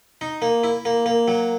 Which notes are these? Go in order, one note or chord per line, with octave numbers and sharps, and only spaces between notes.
D#4
A#3
E4
A#3
A#3
F#3